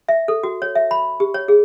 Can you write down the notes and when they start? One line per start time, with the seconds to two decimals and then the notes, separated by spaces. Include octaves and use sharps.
0.08 E5
0.28 A4
0.43 F#4
0.62 C#5
0.75 E5
0.91 B5
1.20 G4
1.34 C#5
1.48 G#4